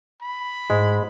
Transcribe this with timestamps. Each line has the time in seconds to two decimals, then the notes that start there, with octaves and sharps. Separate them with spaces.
0.22 B5
0.70 G#2 G#3